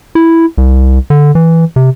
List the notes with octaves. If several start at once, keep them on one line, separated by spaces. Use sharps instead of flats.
E4
C2
D3
E3
C3